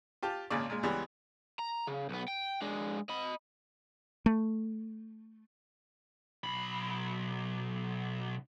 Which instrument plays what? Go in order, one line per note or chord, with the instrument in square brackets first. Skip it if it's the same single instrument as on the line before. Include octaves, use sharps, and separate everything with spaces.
[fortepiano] F4 G4 A5
G#1 A#2 C#3 D5
A#2 G#3
C#2 E3 G3 G#3 B3
[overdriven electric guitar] A#5
C#3
B1 B3
G5
G#3 D4
D#5 B5
[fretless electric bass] A3
[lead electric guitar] B1 B5